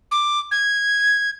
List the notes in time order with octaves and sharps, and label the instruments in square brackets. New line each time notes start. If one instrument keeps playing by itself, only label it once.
[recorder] D6
G#6